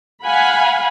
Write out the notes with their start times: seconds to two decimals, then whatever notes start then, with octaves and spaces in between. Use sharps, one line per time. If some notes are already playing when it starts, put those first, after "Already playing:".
0.24 F5 F#5 G#5 B5